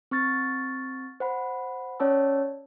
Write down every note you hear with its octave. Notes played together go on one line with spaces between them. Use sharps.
C4 C#6 F6 A6
C5 F#5 B5
C#4 C#5 D5 A5 E6